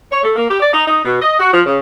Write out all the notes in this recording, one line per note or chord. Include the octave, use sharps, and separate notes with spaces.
C#5
A3
A#3
G4
D5
D#4
D#4
B2
D#5
F#4
F3
C#3